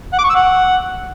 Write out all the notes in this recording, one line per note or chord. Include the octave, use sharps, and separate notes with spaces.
F#5
D6
C#6
E6
F#5